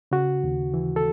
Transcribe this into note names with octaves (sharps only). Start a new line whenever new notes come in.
C#3 F#4
D#2
E3
A4